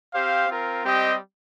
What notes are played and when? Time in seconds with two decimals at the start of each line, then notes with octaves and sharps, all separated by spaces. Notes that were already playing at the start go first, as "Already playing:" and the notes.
0.13 C4 G4 C5 F5
0.48 C4 F4 A#4
0.84 G3 C4 G4 D#5